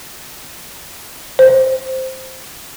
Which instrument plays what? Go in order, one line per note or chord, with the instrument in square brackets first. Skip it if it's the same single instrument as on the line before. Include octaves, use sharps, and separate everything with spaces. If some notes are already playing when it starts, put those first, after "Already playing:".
[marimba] C5